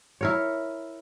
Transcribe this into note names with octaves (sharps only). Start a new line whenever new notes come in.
E4 A#4 C#5